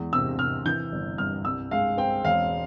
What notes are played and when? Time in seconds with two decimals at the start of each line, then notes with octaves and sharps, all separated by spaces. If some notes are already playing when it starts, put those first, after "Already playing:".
Already playing: E2 G#3
0.13 C3 E6
0.39 C3 F6
0.65 E3 G6
0.92 G1
1.18 G2 F6
1.45 C2 E6
1.71 G#3 F5
1.97 C4 G5
2.24 E1 F5